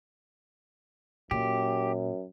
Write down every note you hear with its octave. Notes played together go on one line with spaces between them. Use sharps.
F#2 A#2 G4